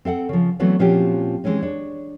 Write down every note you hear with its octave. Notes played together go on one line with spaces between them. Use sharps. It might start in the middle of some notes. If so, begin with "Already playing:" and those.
C4 A4 F5 F#5
C#3 F3
E3 F#3 A3 B3 C4 D4
A#2 F3 C4 C#4 F#4 G4
E3 G#3 C4 C#4 D#4
D4 C#5